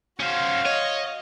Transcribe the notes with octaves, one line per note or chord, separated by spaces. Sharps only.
C#4 F#4 C5 F5
C#5 D#5